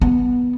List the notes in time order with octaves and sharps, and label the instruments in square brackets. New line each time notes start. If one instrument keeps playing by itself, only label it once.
[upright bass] B3